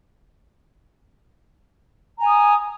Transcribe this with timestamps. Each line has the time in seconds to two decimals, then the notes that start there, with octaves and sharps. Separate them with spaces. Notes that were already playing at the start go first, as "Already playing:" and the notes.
2.18 A#5
2.22 G#5
2.25 D#6